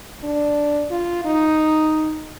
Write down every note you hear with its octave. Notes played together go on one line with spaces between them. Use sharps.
D4
F4
D#4